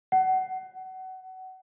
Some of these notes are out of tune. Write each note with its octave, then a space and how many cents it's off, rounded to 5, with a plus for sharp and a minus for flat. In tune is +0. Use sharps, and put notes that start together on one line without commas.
F#5 +25